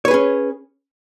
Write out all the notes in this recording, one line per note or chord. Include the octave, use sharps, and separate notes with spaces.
C#4 G#4 B4 C#5